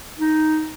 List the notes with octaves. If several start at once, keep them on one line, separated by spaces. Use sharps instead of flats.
D#4